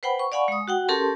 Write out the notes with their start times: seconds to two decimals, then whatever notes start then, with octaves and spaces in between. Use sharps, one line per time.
0.03 B4 C5 F#5 G5 B5
0.19 C#6
0.32 D5 F5 F#5 G#5 B5 C#6
0.48 G#3 D#6
0.68 F#4 F#5 G5
0.88 C#4 G4 A4 A#4 A5 C6